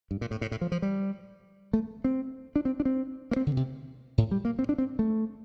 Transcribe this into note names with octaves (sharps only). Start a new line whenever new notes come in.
G2
A#2
A2
A2
A2
F3
F3
G3
A3
C4
D4
C4
D4
C4
A#3
C4
D3
C3
A2
G3
A#3
C4
D4
C4
A3